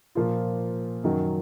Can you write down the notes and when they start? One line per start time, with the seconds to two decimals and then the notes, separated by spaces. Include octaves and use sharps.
0.15 A#2 F3 A#3 F4
1.04 F#2 D#3 F#3